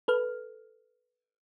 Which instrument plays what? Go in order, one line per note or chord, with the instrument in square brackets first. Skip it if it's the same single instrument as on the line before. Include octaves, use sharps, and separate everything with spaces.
[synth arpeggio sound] A4 B4 F6